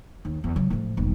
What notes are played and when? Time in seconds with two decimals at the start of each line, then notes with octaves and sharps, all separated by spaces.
0.25 D#2
0.44 E2
0.56 C#3 F#3
0.70 A2 F3
0.97 D#1 B1